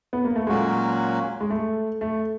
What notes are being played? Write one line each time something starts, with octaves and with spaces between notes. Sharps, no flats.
B3
A#3
A3
A#2 F#3 G#3 A#3 C#4 F#4
G#3
A3
A3